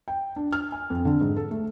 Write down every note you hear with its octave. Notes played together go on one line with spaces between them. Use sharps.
G5
D4
F6
G#5
F2
D3
G#2
A4
A3